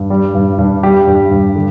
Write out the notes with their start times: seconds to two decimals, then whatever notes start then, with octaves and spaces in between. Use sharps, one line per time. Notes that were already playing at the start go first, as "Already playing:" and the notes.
Already playing: G2
0.10 G3
0.35 G2
0.58 G2
0.83 G3 G4
1.07 G2
1.31 G2
1.55 D3